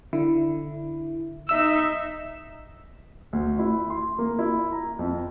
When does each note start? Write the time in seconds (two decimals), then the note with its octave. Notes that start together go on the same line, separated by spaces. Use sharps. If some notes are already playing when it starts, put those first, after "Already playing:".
0.13 D3 E4
1.49 D#4 E5 E6
3.33 D2
3.59 E4
3.90 C6
4.19 A#3
4.39 E4
4.72 A#5
4.99 F2